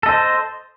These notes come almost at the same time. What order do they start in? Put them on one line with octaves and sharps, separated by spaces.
A4 D#5 C5